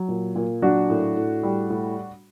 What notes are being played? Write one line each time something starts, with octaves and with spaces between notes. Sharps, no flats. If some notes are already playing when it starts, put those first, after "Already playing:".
Already playing: F#3
A#2
A#2
F#3 D4 F#4
A2
A2
G3
A2